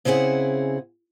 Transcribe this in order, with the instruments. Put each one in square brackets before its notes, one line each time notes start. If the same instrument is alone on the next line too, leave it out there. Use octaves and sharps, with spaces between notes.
[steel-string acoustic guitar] C#3 C4 E4 G#4 F#5